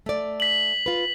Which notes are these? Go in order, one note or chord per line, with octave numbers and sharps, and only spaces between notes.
A3 D5
B6 F#7
F4 B4